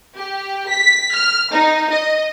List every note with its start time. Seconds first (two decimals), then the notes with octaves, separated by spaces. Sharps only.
0.16 G4
0.69 B6
1.14 F6
1.53 D#4
1.92 D#5